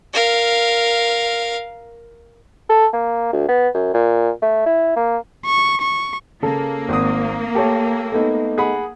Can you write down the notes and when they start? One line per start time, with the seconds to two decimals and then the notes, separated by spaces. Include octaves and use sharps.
0.14 A#4 F5
2.70 A4
2.93 A#3
3.33 D2
3.49 B3
3.74 F#2
3.94 A#2
4.42 A3
4.66 E4
4.96 A#3
5.45 C#6
5.82 C#6
6.43 C#3 A#3 A4
6.89 G#1 C4 D#6
7.55 G4 A4 C#5
8.12 A3 B3 D#4
8.58 G#4 F#5 B5